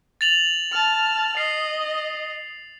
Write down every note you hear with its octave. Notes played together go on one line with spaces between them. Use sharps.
A6 F7 F#7
A5 F6
D#5 C7